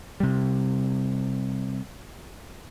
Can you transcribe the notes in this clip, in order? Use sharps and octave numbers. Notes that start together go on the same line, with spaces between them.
C3 G3